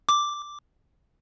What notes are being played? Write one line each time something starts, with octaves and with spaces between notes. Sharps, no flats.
D6